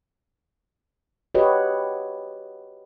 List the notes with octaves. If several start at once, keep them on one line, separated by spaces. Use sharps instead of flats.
F#4 G4 B4 C#5 D#5